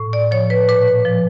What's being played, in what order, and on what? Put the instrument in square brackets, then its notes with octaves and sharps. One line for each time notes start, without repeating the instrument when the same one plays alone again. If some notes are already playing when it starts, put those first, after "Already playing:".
Already playing: [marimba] A2
D5
F3 C#5
B4
A#2 B4
F3